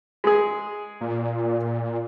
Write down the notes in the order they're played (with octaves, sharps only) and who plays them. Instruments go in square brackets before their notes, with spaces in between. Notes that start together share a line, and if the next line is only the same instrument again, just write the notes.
[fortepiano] G#3 G#4
[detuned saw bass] A#2